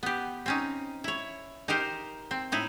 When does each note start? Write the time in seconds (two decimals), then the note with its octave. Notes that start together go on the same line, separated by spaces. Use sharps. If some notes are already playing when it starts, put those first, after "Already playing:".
0.03 B3 G4
0.46 C4 C#4 D#4
1.04 E4 C#5
1.68 D#4 G4 A#4 C5
2.31 C4
2.52 A2 D#4 E4